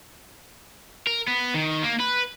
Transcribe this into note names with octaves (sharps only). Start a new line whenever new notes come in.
A#4
B3
D#3
A#3
B4